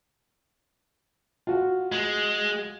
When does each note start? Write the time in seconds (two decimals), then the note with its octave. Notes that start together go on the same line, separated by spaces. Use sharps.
1.47 F4 F#4
1.92 G#3